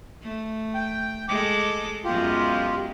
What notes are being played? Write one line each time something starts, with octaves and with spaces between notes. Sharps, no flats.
A3
G5
G#3 A4 D6
F#2 G#3 B3 F4 G4